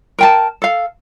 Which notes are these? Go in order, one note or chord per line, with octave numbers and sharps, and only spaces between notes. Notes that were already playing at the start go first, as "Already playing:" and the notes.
A#4 G5 A5
A4 F5